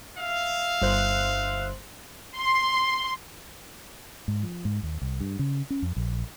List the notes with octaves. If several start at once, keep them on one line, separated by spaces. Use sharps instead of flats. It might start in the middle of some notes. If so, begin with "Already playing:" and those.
E5 F5
G1 C5 F#6
C6
G#2
F3
G#2
D#2
C2
G2
C#3
C#4
F2
A#1